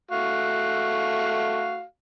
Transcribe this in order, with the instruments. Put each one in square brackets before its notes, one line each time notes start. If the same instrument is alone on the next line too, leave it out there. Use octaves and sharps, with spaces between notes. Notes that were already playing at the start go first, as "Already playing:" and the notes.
[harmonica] A3 F#4 F5